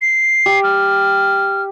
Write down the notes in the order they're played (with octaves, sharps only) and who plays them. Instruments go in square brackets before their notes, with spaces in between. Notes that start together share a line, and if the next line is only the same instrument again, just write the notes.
[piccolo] C7
[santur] G4
[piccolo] F6